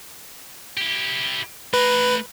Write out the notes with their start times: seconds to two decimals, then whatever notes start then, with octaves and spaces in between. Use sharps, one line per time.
0.78 E4 G4
1.74 A3 B4 A#5